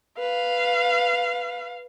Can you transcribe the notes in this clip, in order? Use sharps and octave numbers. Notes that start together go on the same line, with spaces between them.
B4 F5